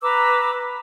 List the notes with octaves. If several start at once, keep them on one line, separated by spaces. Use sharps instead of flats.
B4 A#5 D6 E6